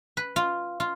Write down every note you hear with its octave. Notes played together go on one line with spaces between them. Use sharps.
B4
F4
F4